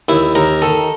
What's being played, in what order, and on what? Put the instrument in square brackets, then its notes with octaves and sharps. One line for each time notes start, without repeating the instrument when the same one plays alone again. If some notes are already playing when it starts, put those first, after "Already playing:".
[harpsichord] D#2 E4
D#2 A#4
D#3 A4